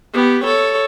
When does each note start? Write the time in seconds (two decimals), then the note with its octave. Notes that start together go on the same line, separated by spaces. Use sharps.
0.14 B3 G4
0.44 A4 C#5